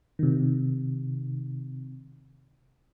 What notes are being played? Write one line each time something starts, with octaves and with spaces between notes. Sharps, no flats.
C3 D#3